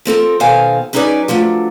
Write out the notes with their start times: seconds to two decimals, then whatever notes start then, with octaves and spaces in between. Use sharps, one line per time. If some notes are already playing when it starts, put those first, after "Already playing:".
0.05 F3 C4 A4 A#4
0.40 B2 D#3 A4 C5 F5 G#5
0.93 F#3 C#4 D#4 G#4 B4 D5
1.28 F3 F#3 A3 D4